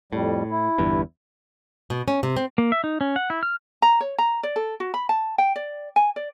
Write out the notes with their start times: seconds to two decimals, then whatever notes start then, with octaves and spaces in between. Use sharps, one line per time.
0.13 F2 A2 G3
0.51 E4
0.78 G1 E2 G2
1.90 B2
2.08 C#4
2.23 C3
2.37 C4
2.58 A#3
2.72 E5
2.84 D#4
3.01 C#4
3.16 F#5
3.30 E4
3.43 F6
3.82 A#5
4.00 C#5
4.18 A#5
4.43 D5
4.56 A4
4.80 F#4
4.94 B5
5.09 A5
5.38 G5
5.56 D5
5.96 G#5
6.16 D5